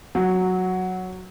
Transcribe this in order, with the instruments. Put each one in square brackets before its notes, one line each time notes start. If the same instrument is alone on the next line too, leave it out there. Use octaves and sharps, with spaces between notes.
[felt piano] F#3